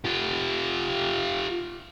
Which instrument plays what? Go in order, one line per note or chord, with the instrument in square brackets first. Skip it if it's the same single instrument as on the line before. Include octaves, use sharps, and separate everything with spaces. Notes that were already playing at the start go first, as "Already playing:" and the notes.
[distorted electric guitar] F4 G4